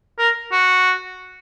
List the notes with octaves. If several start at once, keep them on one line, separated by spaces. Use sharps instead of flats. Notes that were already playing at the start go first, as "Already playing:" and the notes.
A#4
F#4